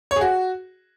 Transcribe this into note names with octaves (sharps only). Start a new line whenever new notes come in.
C#5
G#4
F#4